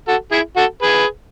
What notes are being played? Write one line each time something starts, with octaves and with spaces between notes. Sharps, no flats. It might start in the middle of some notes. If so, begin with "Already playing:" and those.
F#4 A4
E4 G#4
F#4 A4
G#4 B4